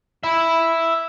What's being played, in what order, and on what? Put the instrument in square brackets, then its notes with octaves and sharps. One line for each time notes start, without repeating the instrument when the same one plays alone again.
[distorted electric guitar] E5 B5